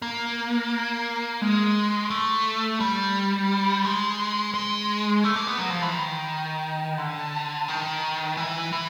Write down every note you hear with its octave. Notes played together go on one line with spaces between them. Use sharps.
A#3
G#3
A3
G3
G#3
G#3
A3
A#3
B3
F#3
F3
E3
D#3
D3
D#3
E3
E3